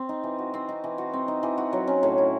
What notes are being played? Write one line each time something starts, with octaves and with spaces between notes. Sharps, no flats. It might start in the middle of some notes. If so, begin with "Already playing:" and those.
Already playing: C4
D#4
E3
F#4
C4
D#4
E3
F#4
C4
D#4
E3
F#4
F#3
C#4
A2
E4